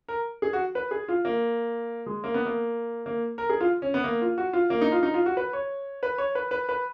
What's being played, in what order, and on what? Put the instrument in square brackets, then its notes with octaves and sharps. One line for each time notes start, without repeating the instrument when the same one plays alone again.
[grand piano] A#4
G#4
F#4
B4
G#4
F4
A#3
G#3
A#3
B3
A#3
A#3
A#4
G#4
F4
C#4
B3
A#3
F4
F#4
F4
A#3
D#4
F4
D#4
F4
F#4
B4
C#5
B4
C#5
B4
B4
B4